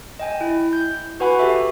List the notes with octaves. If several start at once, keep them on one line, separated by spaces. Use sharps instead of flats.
D#5 G5 G#5
E4
G6
F#4 B4 F#5 G#5 B5 C#6
G4 A4 E5